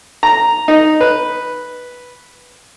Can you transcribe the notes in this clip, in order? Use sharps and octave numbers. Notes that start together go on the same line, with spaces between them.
A#5
D#4
B4